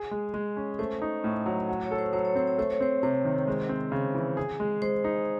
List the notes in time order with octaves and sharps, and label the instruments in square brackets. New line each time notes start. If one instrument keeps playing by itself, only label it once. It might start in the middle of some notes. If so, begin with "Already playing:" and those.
Already playing: [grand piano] G#4
G#3
G#3
C#4
[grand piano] A3 [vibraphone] C5
[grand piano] D#4
A2
F#3
F#4
[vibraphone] C#5
[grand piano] A4
[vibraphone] C5
[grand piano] F#3 [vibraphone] C5
[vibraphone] C#5
[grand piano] C4 [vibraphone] C5
[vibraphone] C#5
[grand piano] A3 [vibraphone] C5
[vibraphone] C#5
[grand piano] C4 [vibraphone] C5
[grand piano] C3 [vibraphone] C5
[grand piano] D#3
G#3
C4
C#3
E3
G#4
G#3
[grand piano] G#3 [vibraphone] C5
[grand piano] D#4